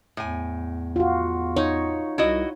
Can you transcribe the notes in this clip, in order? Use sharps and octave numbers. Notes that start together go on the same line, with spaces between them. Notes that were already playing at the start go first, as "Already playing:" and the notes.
E2 A2 G#5
F4 F#4
D#4 C#5
C2 E4 F#4 D#5